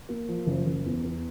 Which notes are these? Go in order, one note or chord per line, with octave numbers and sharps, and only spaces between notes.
A#3
F3
F#1
F#1
E2
E2